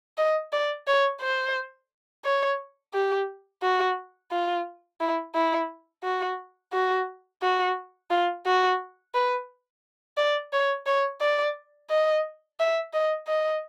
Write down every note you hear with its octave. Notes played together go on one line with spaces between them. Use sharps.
D#5
D5
C#5
C5
C#5
G4
F#4
F4
E4
E4
F#4
F#4
F#4
F4
F#4
B4
D5
C#5
C#5
D5
D#5
E5
D#5
D#5